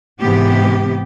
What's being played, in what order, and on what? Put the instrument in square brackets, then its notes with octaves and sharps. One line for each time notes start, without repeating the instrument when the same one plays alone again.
[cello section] G#2 C3 E3 B3 G4